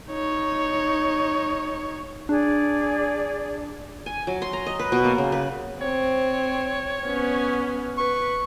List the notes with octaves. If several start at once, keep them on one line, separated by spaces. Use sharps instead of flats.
D#4 C#5
D4 G#4 D5
G#5
F#3
C6
A#5
D#5
B4
B2
A#3
C#3
B4
C4 C#5
B3 C#4
B4 C#6